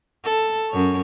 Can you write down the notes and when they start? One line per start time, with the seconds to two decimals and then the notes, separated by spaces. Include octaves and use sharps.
0.25 A4
0.70 F#2 C#5